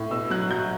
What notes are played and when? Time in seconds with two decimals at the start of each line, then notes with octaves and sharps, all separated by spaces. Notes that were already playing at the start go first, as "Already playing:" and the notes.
Already playing: A2
0.10 B2 E6
0.30 F#3 F#6
0.51 F#3 G6